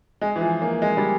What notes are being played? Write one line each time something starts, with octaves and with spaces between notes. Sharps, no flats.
G#3
E3
F3
A#3
G#3
G3